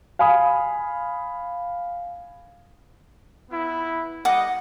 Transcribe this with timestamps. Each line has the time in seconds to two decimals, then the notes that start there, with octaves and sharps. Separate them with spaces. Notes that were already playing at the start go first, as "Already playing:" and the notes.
0.19 F5 G#5 B5 D#6
3.51 B3 E4
4.25 G3 D#5 F#5 D6